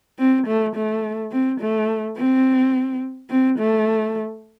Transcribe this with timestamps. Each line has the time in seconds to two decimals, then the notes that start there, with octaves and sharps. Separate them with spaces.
0.19 C4
0.47 A3
0.76 A3
1.32 C4
1.60 A3
2.18 C4
3.30 C4
3.59 A3